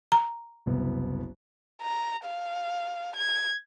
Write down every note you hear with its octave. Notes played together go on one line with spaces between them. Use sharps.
A#5
F#1 C2 B3
A#5
F5
G#6